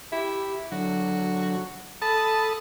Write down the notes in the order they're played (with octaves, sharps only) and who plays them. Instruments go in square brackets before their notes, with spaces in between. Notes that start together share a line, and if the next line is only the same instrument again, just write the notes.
[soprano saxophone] E4 [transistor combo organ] G4
[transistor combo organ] D3 F#3 [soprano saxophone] F#4
[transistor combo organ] A4 B5 D#6 [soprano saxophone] A5